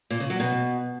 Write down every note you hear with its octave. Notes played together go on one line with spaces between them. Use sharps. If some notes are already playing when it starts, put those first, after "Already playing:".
A#2
C#3
F#3
B2